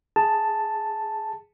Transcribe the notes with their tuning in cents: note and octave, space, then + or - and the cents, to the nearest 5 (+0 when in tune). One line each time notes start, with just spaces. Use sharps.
G#4 +0 A5 +0